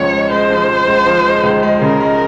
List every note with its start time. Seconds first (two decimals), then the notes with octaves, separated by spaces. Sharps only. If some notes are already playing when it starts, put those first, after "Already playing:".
Already playing: C#2 C#3 F3 C#5
0.12 G#3
0.31 G#3 C5
0.50 F3
0.69 G#3
0.87 C#2
1.06 F3
1.25 G#3
1.43 C#2
1.63 G#3
1.81 C#3 A#4
2.01 G#3